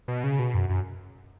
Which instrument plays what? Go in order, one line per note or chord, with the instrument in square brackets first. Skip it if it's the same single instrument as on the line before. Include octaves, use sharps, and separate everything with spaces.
[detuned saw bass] B2
C#3
B2
F#2
F#2